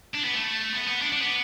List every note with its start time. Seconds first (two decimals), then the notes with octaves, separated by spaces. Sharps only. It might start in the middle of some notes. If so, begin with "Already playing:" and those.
0.14 D4
0.24 B3
0.34 A3
0.73 B3
0.87 B3
1.02 D4
1.12 D4
1.22 B3